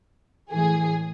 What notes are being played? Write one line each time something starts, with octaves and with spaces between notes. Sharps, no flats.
A2 E3 G#4